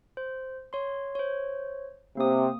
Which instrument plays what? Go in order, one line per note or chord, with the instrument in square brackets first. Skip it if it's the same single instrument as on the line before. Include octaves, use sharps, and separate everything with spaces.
[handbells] C5
C#5 C6
C5 C#5
[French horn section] C3 [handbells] A#3 D#6